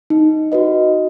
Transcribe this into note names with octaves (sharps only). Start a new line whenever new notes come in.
D#4
F#4 B4 D#5